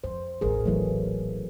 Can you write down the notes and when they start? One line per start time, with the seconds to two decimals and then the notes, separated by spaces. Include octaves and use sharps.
0.04 F2 C5
0.41 D#1 A1 G#4 A#4
0.66 E3 F#3 A3